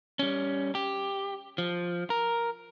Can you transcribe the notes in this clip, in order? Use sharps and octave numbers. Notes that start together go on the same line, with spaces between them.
G3 C#4
G4
F3
A#4